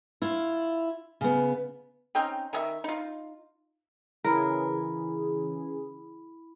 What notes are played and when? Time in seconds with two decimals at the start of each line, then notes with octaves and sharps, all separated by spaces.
0.22 E4 F4
1.21 C#3 B3
2.15 C4 C#4 D#4 G5
2.53 D#3 G#4 E5
2.84 D#4 F4
4.24 C#3 E3 E4 G#4 A#4 B5